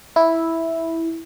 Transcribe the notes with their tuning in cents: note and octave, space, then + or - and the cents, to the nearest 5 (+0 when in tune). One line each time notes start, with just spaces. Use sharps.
E4 -5